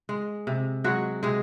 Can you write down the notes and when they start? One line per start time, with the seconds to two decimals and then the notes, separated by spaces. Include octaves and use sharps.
0.09 G#3
0.47 C3
0.84 F#3 G#3 F#4
1.23 C3 G#3 G#4